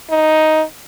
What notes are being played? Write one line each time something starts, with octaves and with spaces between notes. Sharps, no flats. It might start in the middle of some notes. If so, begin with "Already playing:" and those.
D#4